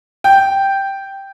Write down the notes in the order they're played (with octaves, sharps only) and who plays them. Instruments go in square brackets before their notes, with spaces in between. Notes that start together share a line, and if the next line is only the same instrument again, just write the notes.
[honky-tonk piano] G5